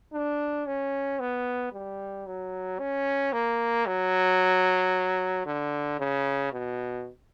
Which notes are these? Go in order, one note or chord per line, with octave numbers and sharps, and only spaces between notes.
D4
C#4
B3
G3
F#3
C#4
A#3
F#3
D3
C#3
B2